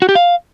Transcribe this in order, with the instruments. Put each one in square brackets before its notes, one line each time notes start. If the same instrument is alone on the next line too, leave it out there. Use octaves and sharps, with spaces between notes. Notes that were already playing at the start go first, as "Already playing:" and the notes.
[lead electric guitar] F#4
G4
F5